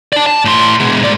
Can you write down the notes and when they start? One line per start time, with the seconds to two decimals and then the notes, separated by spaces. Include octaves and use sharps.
0.13 D5 A5
0.26 A5
0.45 A2 C6
0.80 B2 G#3
0.99 G#2 D5